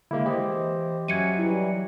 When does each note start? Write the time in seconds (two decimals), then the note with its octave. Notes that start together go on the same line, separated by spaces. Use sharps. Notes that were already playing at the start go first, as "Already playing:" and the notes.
0.11 D3 G#3 A#3 E4
0.26 E3 G4 C5 D#5
1.08 F#3 C#4 F#4 E5 G#6 C#7 D#7
1.38 E3 G3 E4